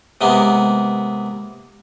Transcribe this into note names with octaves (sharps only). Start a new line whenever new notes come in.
C3 G#3 A#3 B3